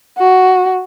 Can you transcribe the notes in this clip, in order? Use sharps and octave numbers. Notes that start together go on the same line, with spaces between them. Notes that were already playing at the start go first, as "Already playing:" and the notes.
F#4